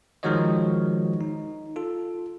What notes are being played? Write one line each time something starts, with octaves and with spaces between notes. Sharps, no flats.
D#3 F3 G#3 F#4 C#5 D#5
D#4
F4 A4